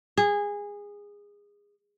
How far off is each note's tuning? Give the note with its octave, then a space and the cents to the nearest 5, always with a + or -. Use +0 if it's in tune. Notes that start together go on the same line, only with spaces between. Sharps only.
G#4 -20